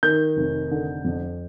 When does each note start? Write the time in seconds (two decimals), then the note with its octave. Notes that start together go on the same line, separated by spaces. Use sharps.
0.03 D#3 G6
0.37 F1
0.71 D3
1.05 F2